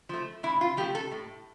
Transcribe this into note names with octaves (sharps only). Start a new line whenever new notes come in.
F3 A3
A2 E4
F4
F3 A3 G4
A4
A2